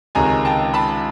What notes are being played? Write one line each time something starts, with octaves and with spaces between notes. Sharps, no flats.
C#2 C3 D#3 G#3 C#4 G#5 A#5
G5 A5
A5 B5